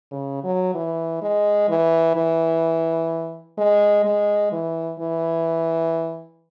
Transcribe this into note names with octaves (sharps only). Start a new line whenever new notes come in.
C#3
F#3
E3
G#3
E3
E3
G#3
G#3
E3
E3